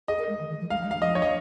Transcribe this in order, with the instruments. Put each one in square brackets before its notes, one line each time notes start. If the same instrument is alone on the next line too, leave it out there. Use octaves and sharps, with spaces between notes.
[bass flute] G#4 [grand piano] D#5
[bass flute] A#4
G#3
D#3
D#3
F3
[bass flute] G#3 [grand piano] F5
[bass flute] F3
G#3
[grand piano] F5
[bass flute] F3 [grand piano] D#5
[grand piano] C#5
D#5